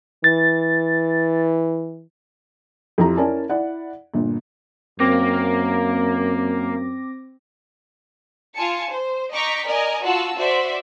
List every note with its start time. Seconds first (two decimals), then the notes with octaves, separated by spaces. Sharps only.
0.24 E3 A6
2.98 F2 F3 E4 G4 A#5
3.17 C#4 E4 A#4 D5 G#5 A5
3.49 E4 D5 F#5
4.14 G1 A#2
5.00 F#2 A#3 C4 D6 A#6
8.55 F4 G#5 A5 C#7
8.92 C5
9.32 D#5 A#5 C#6 D6 G6 B6
9.66 A#4 D5 D#5 G#5 A#5
10.05 F4 F#4 F#5 A5 E6
10.36 F#4 C5 D5 E5